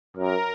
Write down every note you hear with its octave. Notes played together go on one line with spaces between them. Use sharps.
F#2 A#4